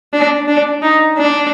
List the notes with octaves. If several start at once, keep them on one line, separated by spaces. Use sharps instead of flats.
D4
D4
D#4
D4